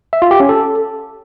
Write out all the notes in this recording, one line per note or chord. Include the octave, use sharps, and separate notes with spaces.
E5
F4
G4
C#4
A4